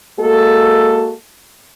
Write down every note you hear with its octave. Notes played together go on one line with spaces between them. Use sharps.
G#3 A#3 F#4 A4